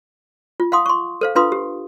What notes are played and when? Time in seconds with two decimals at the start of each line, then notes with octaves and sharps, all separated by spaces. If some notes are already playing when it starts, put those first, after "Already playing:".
0.60 F4
0.72 F5 F#5 C6 D#6
0.86 C6 C#6
1.21 A4 C5 F5
1.35 D4 F4 B4 F5 C6 D#6
1.52 G4